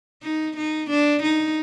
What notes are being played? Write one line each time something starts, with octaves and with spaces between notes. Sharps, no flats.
D#4
D#4
D4
D#4